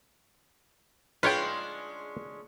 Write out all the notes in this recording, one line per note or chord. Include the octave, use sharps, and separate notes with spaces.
G#3 C#4 D4 F4 B4 C#5 G5